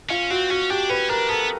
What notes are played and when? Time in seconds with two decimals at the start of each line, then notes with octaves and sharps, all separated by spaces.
0.10 C#4 F4
0.30 C4 F#4
0.50 C#4 F#4
0.70 D4 G4
0.89 C#4 B4
1.09 D4 A#4
1.29 B3 A4